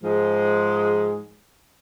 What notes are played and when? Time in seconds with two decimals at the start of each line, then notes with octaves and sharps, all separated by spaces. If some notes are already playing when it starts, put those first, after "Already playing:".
0.03 G#2 F3 G#3